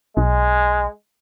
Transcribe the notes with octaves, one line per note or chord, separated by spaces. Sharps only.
B1 G#3